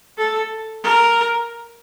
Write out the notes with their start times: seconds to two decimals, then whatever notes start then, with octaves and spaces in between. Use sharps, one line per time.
0.18 A4
0.84 A#4